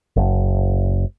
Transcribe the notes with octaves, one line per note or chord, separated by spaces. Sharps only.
F#1